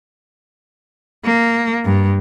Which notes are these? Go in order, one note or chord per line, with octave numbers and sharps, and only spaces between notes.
A#3
G2